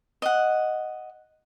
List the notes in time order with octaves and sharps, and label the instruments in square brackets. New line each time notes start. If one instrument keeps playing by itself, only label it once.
[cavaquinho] D#5 F#5